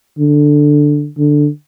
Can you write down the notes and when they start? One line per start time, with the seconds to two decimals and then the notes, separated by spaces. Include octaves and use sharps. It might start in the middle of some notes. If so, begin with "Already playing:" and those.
0.19 D3
1.18 D3